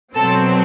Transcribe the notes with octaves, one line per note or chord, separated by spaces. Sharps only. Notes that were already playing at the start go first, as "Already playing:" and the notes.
B2 F#3 C4 A4 A5